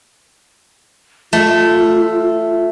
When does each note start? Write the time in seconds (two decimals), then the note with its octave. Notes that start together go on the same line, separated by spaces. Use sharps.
1.33 A3 F4